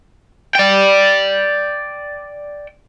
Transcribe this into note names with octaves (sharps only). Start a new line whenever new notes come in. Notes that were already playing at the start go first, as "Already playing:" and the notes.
D5 G5